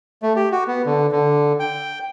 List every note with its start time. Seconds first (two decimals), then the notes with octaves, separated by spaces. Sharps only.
0.22 A3
0.36 G4
0.52 F#4
0.67 B3
0.86 D3
1.12 D3
1.60 G5